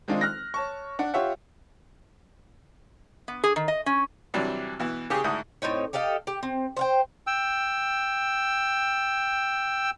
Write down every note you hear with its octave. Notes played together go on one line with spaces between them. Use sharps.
D#3 G#3 C4 D4 D#4 F4
F6 F#6 A#6
C#5 A5 C#6
D4 F#5
F4 G4 C#5 E5 F#5
B3
G#4
D#3
D#5
C#4
C3 E3 F#3 G3 D4
B2 E3
C#3 G4 G#4
D2 G#2 E4 D#6
A2 C4 D#4 C#5
G4 A4 D#5 F5
G4
C4
C5 F5 G5
G5 E6